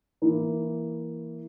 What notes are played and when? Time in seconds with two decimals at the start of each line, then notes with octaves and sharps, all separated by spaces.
0.22 E3 A#3 E4